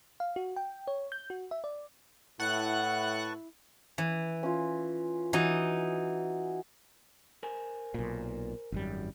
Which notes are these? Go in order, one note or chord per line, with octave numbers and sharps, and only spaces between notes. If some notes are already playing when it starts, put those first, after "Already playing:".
F5
F#4
G5
C#5
G6
F#4
E5
D5
A2 E4 B4 F#5 A5 C#6 F#6
E3
C#4 F4
E3 D#4 F#4
A#4 C5 G#5
B1 A#2
G#1 F#2 G3